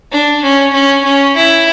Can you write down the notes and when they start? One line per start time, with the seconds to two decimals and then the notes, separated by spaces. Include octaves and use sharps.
0.11 D4
0.43 C#4
0.73 C#4
1.04 C#4
1.35 E4